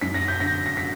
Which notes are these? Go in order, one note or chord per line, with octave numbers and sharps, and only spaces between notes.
F#2 B6
A#6
G6
D3 A#6
A#6
B6